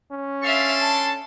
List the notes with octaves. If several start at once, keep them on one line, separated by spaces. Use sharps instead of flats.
C#4
D4 A4 E5 F5 C6
A5